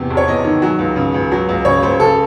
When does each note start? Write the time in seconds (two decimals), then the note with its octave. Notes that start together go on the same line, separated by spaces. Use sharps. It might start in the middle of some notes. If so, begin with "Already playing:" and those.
Already playing: E2 C3
0.10 E1
0.17 C#5
0.28 E2 D#5
0.44 D#3
0.62 F#3
0.79 C#2
0.96 C#3
1.14 C#2
1.32 F#3
1.49 C#2
1.65 C#3 C#5
1.83 C#2 C5
2.00 C#3 A4